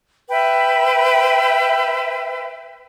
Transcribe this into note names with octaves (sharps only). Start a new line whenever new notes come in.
B4 E5 G5